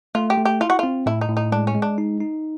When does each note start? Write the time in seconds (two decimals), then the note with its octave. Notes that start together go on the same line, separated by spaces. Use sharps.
0.15 A3 F4
0.30 G4
0.38 A3
0.45 G4
0.61 E4 F4
0.70 F#4
0.79 C4 F4
1.06 A2 E4
1.21 D#4
1.29 A2
1.37 D#4
1.52 G#3 D4
1.67 C#4
1.75 G#3
1.82 D4
1.98 D#4
2.21 D#4